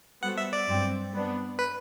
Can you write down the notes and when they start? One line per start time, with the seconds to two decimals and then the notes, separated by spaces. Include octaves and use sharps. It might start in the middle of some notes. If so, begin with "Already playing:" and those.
0.22 G3 B3 F#4 A4 C5 F#5
0.37 E5
0.53 D5
0.67 G2 F#3 C4
1.14 G3 B3 D4
1.59 B4